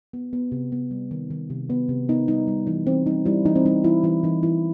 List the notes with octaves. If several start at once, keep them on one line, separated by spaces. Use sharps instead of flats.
B3
B3
C3
B3
G3
D#3
D#3
C3
B3
C3
B3 D#4
G3 D#4
G3
E3 D#4
E3 C4
G3 D#4
G3 E4
E3 D#4
C4
G3 D#4
E3 E4
E3 E4
E3 D#4
E3 E4